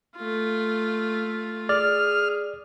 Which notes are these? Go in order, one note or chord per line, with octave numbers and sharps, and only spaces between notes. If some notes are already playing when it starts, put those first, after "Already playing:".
A3 F4
G#4 D5 F6